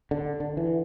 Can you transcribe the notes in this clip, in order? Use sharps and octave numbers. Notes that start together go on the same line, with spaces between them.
D3
D3
E3